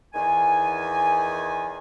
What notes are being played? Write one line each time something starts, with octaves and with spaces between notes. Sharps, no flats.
E2 D#3 G#5